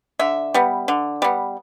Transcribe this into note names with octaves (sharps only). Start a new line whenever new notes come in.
D3 E5
G3 B3
D3
G3 B3